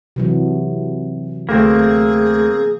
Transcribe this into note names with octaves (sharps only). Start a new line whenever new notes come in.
C3 E3 F#3
D2 A3 A#3 C4 G#4